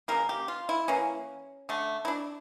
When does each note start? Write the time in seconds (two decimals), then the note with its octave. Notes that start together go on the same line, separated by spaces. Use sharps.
0.08 C#3 G3 A#3 A#4
0.29 G4
0.48 F4
0.69 E4
0.88 E3 A#3 C#4
1.69 D3 A3
2.05 E4
2.08 D4